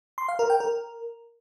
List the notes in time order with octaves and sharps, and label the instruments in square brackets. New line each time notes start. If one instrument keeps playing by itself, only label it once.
[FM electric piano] C6
F5
A#4
G5
A#4